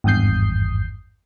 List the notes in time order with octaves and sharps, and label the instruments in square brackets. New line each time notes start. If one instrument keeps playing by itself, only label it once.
[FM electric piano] G#1 E2 G2 D#6 G6 C7